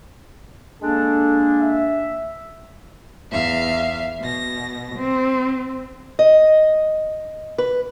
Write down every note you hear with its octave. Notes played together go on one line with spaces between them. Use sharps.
G#3 A#3 D4 A4
E5
E2 E5 F5
B2 A#6
C4
D#5
B4